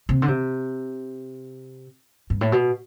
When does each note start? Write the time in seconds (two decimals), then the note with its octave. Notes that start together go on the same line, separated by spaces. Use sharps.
0.09 C3
0.22 D3
0.28 C3
2.30 G2
2.41 A2
2.52 B2